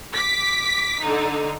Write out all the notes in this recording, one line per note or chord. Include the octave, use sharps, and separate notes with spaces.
D6 B6
D3 D#4